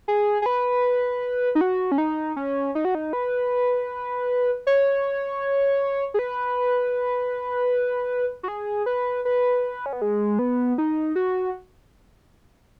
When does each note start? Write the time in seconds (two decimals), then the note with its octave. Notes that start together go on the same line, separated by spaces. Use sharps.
0.08 G#4
0.42 G#4
0.46 B4
1.55 D#4
1.61 F#4
1.92 C#4
1.98 D#4
2.36 C#4
2.75 D#4
2.85 F#4
2.95 D#4
3.13 B4
4.67 C#5
6.14 G#4
6.19 B4
8.43 F#4
8.48 G#4
8.86 B4
9.25 B4
9.86 C#4
9.93 B3
10.02 G#3
10.39 B3
10.78 D#4
11.16 F#4